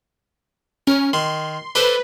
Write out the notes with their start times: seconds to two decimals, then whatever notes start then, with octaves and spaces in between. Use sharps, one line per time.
0.87 C#4 A#4
1.13 D#3 C6
1.75 D4 A4 B4 C5